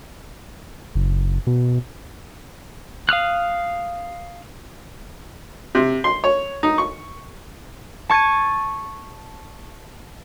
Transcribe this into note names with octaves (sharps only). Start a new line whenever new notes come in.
F#1
B2
F5 D#6 F6 F#6
C3
C6
C#5
D#4
C#6
A5 C#6 G#6 A6 D#7